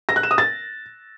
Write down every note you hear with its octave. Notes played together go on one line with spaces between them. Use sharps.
A#6
F#6
E7
D#6
A6